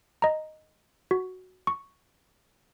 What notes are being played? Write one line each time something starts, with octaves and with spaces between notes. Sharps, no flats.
D#5 A#5
F#4
C#6